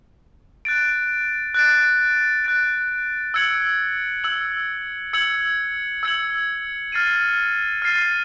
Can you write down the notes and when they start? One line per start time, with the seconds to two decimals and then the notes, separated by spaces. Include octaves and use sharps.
0.65 F#6 A6 D7
1.54 F#6 A6 D7
2.44 F#6 A6 D7
3.34 E6 G#6 C#7 F#7
4.24 E6 G#6 C#7 F#7
5.13 E6 G#6 C#7 F#7
6.03 E6 G#6 C#7 F#7
6.92 F6 A6 C7 D#7
7.82 F6 A6 C7 D#7